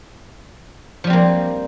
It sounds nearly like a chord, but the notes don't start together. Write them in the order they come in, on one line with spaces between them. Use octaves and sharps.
F3 G3 C4 A#3